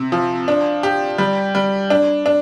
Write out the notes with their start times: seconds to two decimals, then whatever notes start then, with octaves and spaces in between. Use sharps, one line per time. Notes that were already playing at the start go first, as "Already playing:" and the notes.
Already playing: C3
0.12 F3
0.48 D4
0.83 G4
1.18 G3
1.55 G3
1.90 D4
2.26 D4